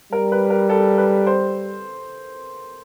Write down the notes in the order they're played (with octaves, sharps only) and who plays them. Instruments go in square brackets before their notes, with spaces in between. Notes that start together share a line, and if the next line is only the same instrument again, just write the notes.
[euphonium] G3 [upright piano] A#4
[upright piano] B4
A#4
A4
B4
C5